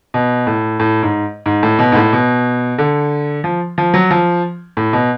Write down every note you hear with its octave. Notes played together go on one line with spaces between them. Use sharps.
B2
A2
A2
G#2
G#2
A2
B2
G#2
A2
B2
D3
F3
F3
F#3
F3
A2
B2